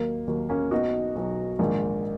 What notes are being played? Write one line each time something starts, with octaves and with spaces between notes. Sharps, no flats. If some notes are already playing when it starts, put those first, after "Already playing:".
Already playing: D#2 D#3 F#3 A#3
D#2 D#3 F#3
A#3 C#4
B1 B2 F#3 D#4 F#4
B1 B2 F#3
A#1 G#2 D#3